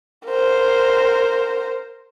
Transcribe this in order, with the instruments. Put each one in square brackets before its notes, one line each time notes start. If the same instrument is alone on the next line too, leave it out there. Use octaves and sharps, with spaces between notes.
[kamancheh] A#4 C5